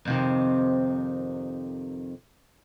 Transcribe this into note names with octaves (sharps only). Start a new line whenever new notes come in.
F2 C3 D#3